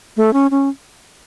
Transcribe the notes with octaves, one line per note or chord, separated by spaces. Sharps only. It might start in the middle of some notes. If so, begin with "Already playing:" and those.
A3
C#4
C#4